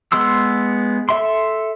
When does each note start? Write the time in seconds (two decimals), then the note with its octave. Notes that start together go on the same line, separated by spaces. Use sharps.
0.12 G#3 B3 C6 E6
1.09 A4 E5 C6